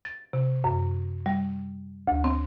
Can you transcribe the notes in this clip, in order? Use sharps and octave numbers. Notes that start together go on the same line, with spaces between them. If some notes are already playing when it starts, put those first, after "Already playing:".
A6
C3
F#2
G3
D2
C4